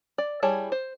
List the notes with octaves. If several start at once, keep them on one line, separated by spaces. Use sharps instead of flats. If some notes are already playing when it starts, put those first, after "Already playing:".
D5
G3 E4 G#4 C#5 A5
C5